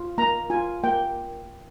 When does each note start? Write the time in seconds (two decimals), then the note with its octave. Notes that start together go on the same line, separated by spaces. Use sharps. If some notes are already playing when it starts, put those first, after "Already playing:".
Already playing: F4
0.18 A#3 A#5
0.50 F4 G#5
0.84 A#3 G5